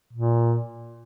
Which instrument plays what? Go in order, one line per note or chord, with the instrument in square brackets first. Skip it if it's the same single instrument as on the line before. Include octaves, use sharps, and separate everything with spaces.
[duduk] A#2